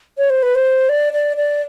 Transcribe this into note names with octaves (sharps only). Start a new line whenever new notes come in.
C#5
C5
B4
C5
D5
D5
D5